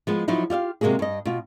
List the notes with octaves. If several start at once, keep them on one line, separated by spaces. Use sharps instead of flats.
F3 G#3 B3
F3 F#3 D#4 E4
F4 G4 E5 F5
C3 G#3 A#3 F#4 G#4
G2 D#5
B2 F4